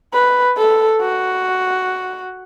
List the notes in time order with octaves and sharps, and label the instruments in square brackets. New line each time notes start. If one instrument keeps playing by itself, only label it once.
[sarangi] B4
A4
F#4